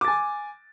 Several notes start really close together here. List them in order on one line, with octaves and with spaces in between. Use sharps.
D6 A6 G#5